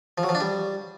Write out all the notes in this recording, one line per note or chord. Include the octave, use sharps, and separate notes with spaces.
F3
F#3
F3
D4
G3